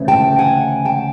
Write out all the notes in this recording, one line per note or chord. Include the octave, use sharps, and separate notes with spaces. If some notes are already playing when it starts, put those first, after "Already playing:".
Already playing: D2 C#3 E3 A3 C#4
G5 A5
F#5 G#5
G5 A5